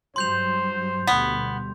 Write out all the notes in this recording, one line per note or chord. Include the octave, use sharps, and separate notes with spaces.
G2 F#3 C5 C6 G6 F7
D2 B2 G3 B3